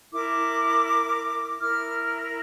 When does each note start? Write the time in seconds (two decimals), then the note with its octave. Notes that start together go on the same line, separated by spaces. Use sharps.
0.12 E4 A#4 D6
1.59 E4 A#4 F6